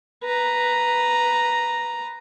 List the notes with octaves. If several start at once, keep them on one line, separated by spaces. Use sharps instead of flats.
B4 A#5